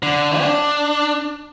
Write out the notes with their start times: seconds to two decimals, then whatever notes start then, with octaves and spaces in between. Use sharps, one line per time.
0.03 D3
0.41 D4